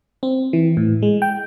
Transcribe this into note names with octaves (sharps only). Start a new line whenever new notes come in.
C4
E3
A2
G#3
G5